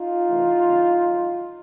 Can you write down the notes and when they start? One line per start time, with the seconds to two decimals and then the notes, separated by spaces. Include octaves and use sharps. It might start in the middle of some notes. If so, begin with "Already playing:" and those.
Already playing: D#4 F4
0.27 C3 E3 A3
0.65 E2 C#3 E3 G3
1.03 G#2 D#3 F#3